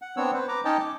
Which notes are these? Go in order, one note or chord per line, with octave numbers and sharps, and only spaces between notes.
F#5
B3 C4 D4 C#5 E6
B4 C5
B4 A#5 D6
C#4 D#4 C#5 D#5 G5 A5
D6